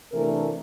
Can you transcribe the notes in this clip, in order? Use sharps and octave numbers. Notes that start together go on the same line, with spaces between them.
C3 E3 A3 D4 A#4